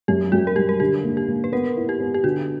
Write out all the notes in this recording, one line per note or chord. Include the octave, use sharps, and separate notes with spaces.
F#2 G4
F#2 F#4
A#4
G3 G4
A#4
D3 G4
A#3
G4
A#3
B4
B3 A#4
E4
G4
B3
G4
D3 F#4